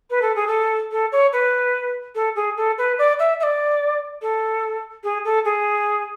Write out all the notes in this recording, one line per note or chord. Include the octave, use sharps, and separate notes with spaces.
B4
A4
G#4
A4
A4
C#5
B4
A4
G#4
A4
B4
D5
E5
E5
D5
A4
G#4
A4
G#4